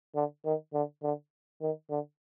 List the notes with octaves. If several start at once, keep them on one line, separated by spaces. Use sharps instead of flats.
D3
D#3
D3
D3
D#3
D3